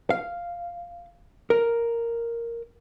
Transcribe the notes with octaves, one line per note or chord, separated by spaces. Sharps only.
F5
A#4